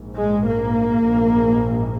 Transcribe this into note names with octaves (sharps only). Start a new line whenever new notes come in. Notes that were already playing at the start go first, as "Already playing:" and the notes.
Already playing: A#1 G#2
G#3
A#3
A#1 G#2